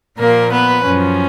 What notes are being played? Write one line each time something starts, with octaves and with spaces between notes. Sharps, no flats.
A#2 F3 A#3 A#4
B3 B4
F#2 F3 C#4